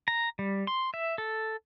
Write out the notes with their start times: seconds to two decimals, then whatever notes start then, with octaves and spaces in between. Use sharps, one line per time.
0.08 A#5
0.39 G3
0.67 C6
0.94 E5
1.18 A4